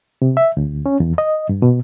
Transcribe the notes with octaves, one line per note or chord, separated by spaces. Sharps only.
C3
E5
D2
C#4
E2
D#5
G2
B2